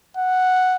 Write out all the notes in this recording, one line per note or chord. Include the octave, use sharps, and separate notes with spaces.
F#5